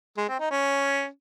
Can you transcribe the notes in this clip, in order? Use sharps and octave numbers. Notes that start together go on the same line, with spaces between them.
G#3
C4
D#4
C#4